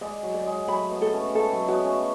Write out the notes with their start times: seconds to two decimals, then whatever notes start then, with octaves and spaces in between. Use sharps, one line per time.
0.01 G#3 D5
0.23 F#3
0.34 D5
0.46 G#3
0.68 F#3 A3 B5
0.90 G#3 B3
1.02 A4
1.12 A3 C#4
1.35 G#3 A4
1.51 F#3 A3
1.68 G#3 B3 F#4
1.85 A3 C#4